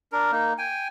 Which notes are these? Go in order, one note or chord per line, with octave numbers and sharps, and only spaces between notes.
D4 A#4
A#3 D#4
G5 G#5